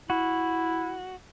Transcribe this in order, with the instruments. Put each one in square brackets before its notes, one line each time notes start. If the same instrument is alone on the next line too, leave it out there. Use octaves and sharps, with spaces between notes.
[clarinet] E4 [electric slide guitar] F#4